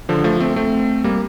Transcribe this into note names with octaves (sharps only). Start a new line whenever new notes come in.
D3 F3
F3 A3
A3 C4
A3 C4
G3 A#3